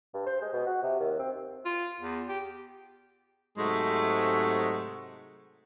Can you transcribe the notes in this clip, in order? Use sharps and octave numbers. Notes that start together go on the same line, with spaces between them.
G2
C5
G#3
B2
F#4
C3
D#2
C4
F4
E2
G4
G#2 C3 F#3 G#3 A3